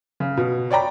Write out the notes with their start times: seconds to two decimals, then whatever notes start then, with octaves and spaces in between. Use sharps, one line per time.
0.20 C#3
0.37 B2
0.71 C#5 D5 G5 A#5 B5